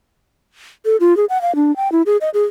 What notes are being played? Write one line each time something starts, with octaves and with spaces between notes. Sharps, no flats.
A4
F4
G#4
F#5
F5
D4
G5
E4
G#4
D#5
G#4